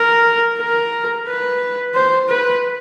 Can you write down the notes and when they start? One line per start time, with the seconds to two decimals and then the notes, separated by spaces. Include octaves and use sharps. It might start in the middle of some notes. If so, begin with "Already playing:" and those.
Already playing: A#4
0.59 A#4
1.27 B4
1.94 C5
2.29 B4